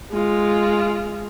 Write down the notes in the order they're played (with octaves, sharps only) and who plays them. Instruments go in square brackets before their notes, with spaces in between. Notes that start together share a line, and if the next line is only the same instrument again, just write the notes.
[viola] G#3 F4